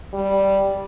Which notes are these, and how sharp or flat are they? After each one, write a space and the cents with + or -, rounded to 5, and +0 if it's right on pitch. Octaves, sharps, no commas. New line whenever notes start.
G3 -5